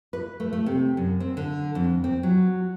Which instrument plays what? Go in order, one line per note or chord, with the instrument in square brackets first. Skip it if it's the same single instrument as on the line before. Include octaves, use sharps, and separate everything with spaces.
[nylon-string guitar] B4
A3
A3
C3
F#2
C4
D3
F2
C4
F#3